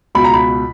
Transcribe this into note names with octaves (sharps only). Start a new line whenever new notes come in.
C#2 B2 B5
A#5
B5